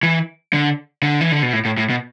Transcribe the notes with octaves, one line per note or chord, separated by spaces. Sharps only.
E3
D3
D3
E3
D3
B2
A2
A2
A2
B2